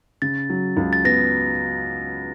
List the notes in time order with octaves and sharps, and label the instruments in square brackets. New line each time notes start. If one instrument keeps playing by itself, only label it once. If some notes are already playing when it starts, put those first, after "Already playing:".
[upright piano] C#3 [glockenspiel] A6
[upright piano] F#3
C#2
[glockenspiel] A6
[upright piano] B3 [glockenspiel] A#6